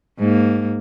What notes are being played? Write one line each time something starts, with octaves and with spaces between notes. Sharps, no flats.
G#2 A#3